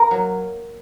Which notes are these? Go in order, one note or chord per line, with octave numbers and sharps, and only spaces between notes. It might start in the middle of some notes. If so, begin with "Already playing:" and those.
Already playing: A#3 A#4
F#3